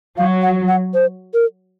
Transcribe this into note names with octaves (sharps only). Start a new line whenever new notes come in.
F#3 F5
F#5
F#5
C5
A#4